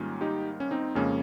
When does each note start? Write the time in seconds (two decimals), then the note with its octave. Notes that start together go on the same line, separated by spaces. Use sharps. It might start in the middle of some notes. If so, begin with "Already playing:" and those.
Already playing: G#2 D#3 G3 A#3 C#4 F4
0.21 D#4 G4
0.60 C#4
0.71 C4 D#4
0.95 F2 C#3 G#3 A#3 C#4